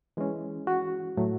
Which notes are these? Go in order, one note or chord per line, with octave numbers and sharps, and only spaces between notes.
E3 G#3 C#4
F#4
A2 F#3 A3